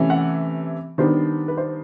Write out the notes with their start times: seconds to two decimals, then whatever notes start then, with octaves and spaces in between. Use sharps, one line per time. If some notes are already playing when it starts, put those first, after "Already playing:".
Already playing: C3 E3 A3 C#4
0.10 F#5
0.98 D#3 G3 B3 D4 C5
1.48 B4
1.57 C5